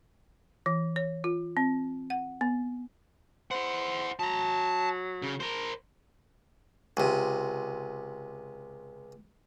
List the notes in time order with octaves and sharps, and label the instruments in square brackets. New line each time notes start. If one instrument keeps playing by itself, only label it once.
[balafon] E3
C#5
F4
C4
F#5
B3
[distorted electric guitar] E4 F#5 [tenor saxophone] C5
[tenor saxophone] F#3 [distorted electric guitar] A5 A#5
[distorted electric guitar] C#3
A#4 C5
[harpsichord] C#2 C3